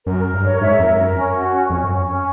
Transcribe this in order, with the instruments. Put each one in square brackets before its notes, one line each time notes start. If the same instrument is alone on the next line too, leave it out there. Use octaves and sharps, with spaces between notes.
[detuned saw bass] F#2 [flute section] A#4
[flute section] A#4
[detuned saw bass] G2
[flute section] C#5
[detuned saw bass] G#2 [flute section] E5
[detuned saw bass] F2 [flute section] A#4
[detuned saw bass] F#2 [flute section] A#4
[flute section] C#4
F#4
C#4
[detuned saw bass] F2 [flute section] C#4
[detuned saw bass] F#2 [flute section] C#4
[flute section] C#4